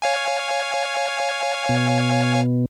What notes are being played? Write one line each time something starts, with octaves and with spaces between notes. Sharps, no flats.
C#5 F5 G#5
B2